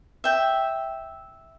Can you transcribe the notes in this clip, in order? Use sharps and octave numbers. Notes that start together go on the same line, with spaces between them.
E5 G5